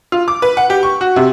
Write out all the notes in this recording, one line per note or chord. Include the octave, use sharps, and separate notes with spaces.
F4
D6
B4
F#5
G4
C#6
F#4
C3